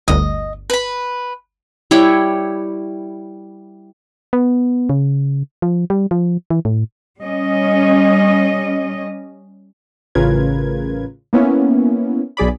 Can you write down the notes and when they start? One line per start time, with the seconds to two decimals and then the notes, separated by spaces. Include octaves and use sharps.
0.08 G1 D2 D#5
0.70 B4 B5
1.91 G3 E4 C#5 G5
4.33 B3
4.89 C#3
5.62 F3
5.90 G3
6.11 F3
6.50 E3
6.65 A2
7.20 G3 C#4 D#5
10.15 A1 C#3 F4 A#4 B4 G#6
11.33 A#3 B3 C#4 E4
12.37 B1 G#4 D5 B5